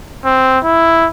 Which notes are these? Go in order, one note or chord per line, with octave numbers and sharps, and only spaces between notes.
C4
E4